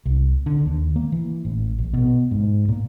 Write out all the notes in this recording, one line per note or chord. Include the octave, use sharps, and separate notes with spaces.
C2
D3
D#2
A#3
E3
A1
A#1
B2
G#2
A#2